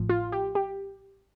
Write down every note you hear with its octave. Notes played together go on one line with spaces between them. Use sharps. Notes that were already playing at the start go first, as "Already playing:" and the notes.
Already playing: A1 A2 F3
F4
G4
G4